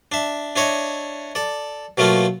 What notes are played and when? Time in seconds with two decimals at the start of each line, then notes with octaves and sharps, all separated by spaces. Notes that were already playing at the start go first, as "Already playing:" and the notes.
0.12 D4 E5
0.56 D4 E4 C#5 D#5
1.35 A4 D5
1.97 B2 F#3 A3 A#3 F4